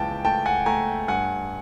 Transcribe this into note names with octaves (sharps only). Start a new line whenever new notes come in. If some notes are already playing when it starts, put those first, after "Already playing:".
Already playing: C#2 E3 G5 A5
A3 G5 A5
F#5 G#5
A3 G#5 A#5
G2 F#5 G#5